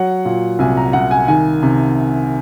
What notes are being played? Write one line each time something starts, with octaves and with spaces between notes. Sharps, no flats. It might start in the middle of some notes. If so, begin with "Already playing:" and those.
Already playing: F#3 F#5
A#2
C2 G#5
A#5
C2 F#5
G#5
D#3 G#5
C3